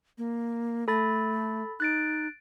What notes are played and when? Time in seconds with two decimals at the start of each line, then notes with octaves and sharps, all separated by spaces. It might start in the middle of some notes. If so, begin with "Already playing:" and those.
0.18 A#3
0.88 A3 A4 B5 A6
1.80 D#4 F#6 A6 D7